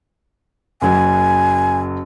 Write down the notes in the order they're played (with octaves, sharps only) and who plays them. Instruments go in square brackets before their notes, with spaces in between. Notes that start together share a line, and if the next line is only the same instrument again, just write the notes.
[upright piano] F#1 F#3 [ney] G#5